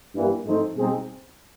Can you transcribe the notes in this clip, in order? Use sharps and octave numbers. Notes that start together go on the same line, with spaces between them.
G2 E3 G3 A#3
G#2 F3 A3 C4 D#4
B2 G3 C4 D#4 G#4